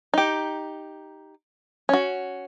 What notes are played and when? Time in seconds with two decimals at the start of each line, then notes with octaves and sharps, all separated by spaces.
0.14 D#4 G4
1.89 C#4 F#4